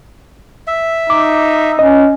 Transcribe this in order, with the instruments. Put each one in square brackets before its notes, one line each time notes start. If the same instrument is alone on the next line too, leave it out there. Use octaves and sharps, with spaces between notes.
[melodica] E5
[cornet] D#4 [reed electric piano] D6
[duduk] C#4 [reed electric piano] D#5